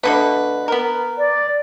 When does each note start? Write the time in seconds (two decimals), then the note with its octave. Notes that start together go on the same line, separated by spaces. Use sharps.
0.04 B2 D3 A3 B4
0.68 B3 A#4
1.18 D5